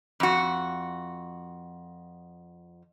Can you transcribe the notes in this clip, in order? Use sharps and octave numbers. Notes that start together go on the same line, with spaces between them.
F2 F#4